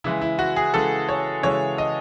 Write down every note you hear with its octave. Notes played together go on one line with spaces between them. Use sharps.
C#3 E3 G#3 E4
E4
F#4
G#4
C#3 E3 G#3 A4
C#5
C#3 E3 G#3 C#5
D#5